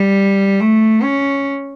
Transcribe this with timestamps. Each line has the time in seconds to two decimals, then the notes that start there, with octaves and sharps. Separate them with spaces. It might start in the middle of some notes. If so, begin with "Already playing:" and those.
Already playing: G3
0.61 A3
1.03 C#4